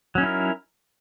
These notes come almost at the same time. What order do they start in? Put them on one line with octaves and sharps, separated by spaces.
F#3 C#4 D#4 E4 A#4